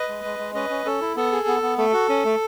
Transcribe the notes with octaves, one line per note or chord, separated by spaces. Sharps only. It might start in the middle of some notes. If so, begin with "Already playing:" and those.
Already playing: B4 D#5
G#3
G#3
G#3
C#4 B4 D#5
C#4
C#4 A4
E4
B3 A4
G#4
B3
B3
A3 A4
F#4
C#4
A3